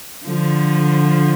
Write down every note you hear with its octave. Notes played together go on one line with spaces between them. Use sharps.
D3 F3